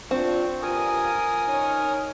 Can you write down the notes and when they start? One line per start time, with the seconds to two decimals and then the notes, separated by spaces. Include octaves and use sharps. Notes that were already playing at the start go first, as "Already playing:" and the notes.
0.11 C4 D4 F4 C#6
0.62 G2 F4 A#4 G#5 D#6
1.48 C#4 D#4 C#5